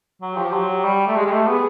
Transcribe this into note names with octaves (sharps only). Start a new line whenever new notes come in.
F#3
G4
F3
G4
F#3
G3
A3
G#3 G4
G#3
A3
B3 G#4